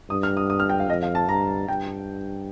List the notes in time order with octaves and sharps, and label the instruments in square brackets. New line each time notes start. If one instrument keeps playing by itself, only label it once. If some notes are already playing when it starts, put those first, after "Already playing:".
[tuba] G2 [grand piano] D#6
[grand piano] F6
D#6
D#6
F6
G5
F5
[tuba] F2 [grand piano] D#5
[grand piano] F5
A5
[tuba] G2 [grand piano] A#5
[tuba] G2 [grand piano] G5